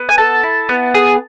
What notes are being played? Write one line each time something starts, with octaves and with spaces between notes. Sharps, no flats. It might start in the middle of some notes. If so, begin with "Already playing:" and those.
Already playing: B3
G#5
A4 A5
E4
B3
G#4